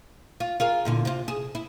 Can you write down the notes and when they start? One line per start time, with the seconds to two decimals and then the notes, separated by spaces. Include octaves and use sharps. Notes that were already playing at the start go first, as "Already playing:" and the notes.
0.40 F4
0.60 F4 G#4 A#4
0.85 E2 A#2 D3
1.05 C3 F4
1.28 G#4
1.55 E4